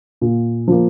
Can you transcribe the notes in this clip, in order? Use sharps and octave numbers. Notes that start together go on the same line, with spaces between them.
A#2
F3 A#3